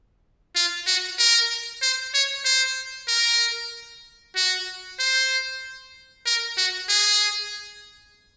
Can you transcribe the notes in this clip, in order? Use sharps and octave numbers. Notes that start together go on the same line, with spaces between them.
F4
F#4
A#4
C5
C#5
C5
A#4
F#4
C5
A#4
F#4
G#4